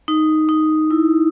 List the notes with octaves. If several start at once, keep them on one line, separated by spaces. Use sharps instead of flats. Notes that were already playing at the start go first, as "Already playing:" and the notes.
D#4
D#4
E4